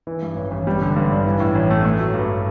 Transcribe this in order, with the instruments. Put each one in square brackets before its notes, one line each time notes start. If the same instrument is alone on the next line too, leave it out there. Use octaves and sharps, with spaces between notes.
[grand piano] E3
G2
A1
A1
G3
D3
G2
D4
E3
A2
A1
A3
A3
F#3
G2